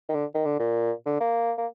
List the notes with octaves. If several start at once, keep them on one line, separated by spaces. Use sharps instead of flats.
D#3
D3
D#3
D3
A#2
D3
A#3
A#3